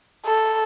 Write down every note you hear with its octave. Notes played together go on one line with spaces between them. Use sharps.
A4